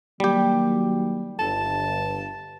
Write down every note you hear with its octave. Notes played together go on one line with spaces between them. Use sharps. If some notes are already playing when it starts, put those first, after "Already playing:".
D#3 F#3 G3 A#3 G4
G1 A5